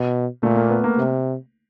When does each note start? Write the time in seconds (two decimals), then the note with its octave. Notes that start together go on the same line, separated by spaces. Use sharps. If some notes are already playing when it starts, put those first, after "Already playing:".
Already playing: B2
0.42 A#2 A3
0.56 A#3
0.70 B3
0.84 A#3
0.97 C3